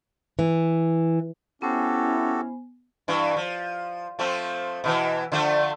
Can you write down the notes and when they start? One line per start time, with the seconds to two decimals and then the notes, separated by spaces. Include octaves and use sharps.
0.39 E3
1.62 B3 C#4 E4 F#4 G4 A4 C5 G#5
3.08 G2 E3
3.36 F3
4.19 F3 A3 C4
4.84 B2 D#3 E3
5.32 D3 F3 A3